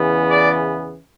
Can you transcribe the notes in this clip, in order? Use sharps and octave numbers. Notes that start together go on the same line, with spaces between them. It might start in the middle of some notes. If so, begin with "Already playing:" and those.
Already playing: E2 C#3 E3 B3
D5